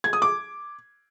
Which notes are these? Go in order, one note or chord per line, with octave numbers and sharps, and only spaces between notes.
G#6
D#6
D6